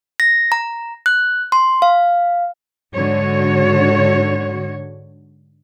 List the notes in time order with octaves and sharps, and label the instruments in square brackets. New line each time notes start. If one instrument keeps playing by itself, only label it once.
[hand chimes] A#6
A#5
F#6
C6
F5
[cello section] G#2 D3 F#4 C#5